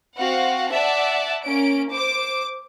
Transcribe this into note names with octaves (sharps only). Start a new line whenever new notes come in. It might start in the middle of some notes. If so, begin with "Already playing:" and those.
C4 F#4 F5 F#5
D5 E5 F#5 A5
A#3 C#4 D7
C5 D6 D7